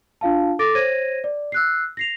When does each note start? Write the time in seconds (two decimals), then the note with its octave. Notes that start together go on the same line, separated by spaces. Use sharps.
0.21 D4 F4 F5 A5
0.59 A4 D6 A6 A#6 D7
0.75 C5 C#5 G#6 A#6 D#7
1.24 D5
1.52 E6 F#6 C7
1.97 A#6 C7 F7